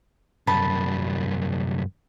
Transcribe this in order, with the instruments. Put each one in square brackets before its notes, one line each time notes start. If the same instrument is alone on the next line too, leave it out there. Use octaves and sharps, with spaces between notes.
[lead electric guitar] C2 F#2 [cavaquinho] A5 B5